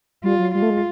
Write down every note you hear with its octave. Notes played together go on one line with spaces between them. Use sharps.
G3 F4
F#3
G3 F4
A3
G#3